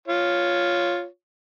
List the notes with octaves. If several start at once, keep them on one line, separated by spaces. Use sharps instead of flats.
F4 C#5